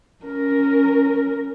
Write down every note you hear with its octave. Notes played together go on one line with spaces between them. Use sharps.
C#4 A#4